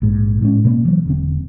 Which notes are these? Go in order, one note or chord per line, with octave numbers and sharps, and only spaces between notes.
A#1 G#2
A2 G#3 A#3 C#4
B2 A#3 C4
E3 F#3
E1 D3 C4